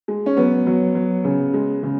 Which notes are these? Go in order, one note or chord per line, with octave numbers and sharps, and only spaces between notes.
G#3
C#4
F#3 B3
F#3
F#3
C#3
G#3
C#3